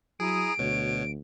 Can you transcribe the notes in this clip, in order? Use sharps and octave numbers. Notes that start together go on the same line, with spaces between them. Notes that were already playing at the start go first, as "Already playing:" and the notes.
F#3 E4 G#4 A#5 D#6 D7
D2 B2 C#5